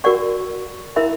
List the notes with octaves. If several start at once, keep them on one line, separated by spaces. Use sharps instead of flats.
F#4 A#4 D5 F#5 C#6
E4 A#4 E5 B5